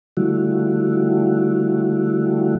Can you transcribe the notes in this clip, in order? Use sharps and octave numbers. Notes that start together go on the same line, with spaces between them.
D3 F3 G3 A3 E4 F#4